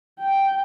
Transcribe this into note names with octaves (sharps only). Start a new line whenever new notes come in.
G5